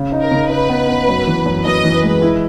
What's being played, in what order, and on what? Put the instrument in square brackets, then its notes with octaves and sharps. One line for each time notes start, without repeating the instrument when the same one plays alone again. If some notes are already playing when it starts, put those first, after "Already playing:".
Already playing: [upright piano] C#3
D#4
[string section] A#4
[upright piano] C#3
[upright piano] D#4 [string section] B4
[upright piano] B3
B3
F#2
E3
F#2
[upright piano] F#2 [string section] D#5
[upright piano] E3
[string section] B4
[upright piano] G#3
E4